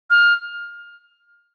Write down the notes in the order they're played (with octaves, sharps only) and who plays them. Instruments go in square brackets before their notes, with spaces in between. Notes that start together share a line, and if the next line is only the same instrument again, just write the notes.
[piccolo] F6